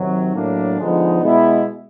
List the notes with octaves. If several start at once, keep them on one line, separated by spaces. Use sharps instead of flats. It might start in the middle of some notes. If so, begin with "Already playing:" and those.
Already playing: C3 D#3 F#3
A2 F#3 A#3 D4
D3 F3 G#3 B3 D#4
B2 G#3 B3 E4